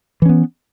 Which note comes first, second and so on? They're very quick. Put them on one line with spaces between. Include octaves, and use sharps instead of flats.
E3 C#4 B3